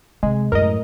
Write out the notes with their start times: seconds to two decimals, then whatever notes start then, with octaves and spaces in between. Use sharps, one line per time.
0.23 C3 G#3
0.52 F#2 A2 A#4 D#5